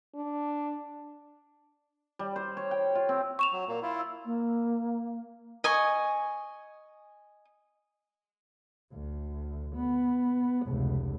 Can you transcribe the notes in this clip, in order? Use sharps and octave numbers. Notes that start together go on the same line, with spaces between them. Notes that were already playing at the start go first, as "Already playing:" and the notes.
D4
G3
C5
C#5
G5
F4
C4
C#6 E7 F7
F#3
A#2 A#3
E4 F4
E6
A#3
D#5 G#5 C#6
D2
B3
F1 C#2